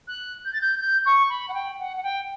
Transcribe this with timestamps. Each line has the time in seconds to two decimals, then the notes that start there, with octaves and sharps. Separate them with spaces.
0.08 F#6
0.45 G6
0.53 A6
0.61 G6
0.80 G6
1.06 C#6
1.29 B5
1.48 F#5
1.54 G5
1.79 F#5
1.97 F#5
2.03 G5